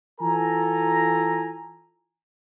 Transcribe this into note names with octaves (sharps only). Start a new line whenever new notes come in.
E3 F4 A4 G#5 A#5